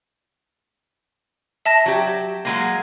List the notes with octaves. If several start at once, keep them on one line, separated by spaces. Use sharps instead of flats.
E5 A5 A#6
F#3 G4
F#3 G#3 A#3